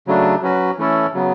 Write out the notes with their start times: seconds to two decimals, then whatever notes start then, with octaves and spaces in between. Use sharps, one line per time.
0.07 C#3 F#3 A3 D4
0.42 F#3 C#4 F#4 B4
0.78 E3 A3 C#4 E4 A4
1.14 C#3 F#3 B3